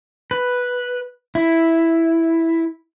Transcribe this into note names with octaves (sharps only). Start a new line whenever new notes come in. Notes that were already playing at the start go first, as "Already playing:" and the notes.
B4
E4